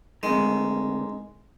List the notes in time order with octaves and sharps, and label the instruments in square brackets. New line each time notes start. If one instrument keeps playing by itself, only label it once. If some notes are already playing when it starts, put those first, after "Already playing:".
[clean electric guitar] D2 C3 D#3 [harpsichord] G#3